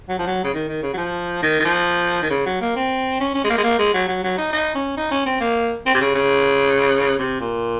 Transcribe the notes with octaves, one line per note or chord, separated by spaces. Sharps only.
F#3
F3
F#3
C#3
D#3
D#3
C#3
F#3
F3
D#3
D#3
F3
D#3
C#3
F#3
A#3
C4
C#4
C#4
G#3
A#3
G#3
A#3
G#3
F#3
F#3
F#3
D#4
D#4
C#4
D#4
C#4
C4
A#3
C4
C3
C#3
C#3
C3
A#2